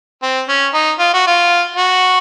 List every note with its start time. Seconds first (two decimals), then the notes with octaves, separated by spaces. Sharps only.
0.23 C4
0.49 C#4
0.74 D#4
0.99 F4
1.13 F#4
1.27 F4
1.76 F#4